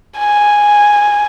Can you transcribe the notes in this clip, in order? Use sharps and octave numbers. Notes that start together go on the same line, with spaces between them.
G#5